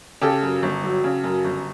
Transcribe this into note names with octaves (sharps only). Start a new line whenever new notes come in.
C#3 G4 A4
F#2
G1
F#3
C#3
F#2
G1